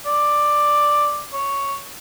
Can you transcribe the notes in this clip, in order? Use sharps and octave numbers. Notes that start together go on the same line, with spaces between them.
D5
C#5